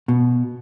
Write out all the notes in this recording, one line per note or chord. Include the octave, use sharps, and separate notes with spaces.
B2